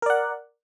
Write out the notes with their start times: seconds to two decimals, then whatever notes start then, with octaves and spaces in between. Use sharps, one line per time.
0.02 A#4
0.06 D5
0.10 F#5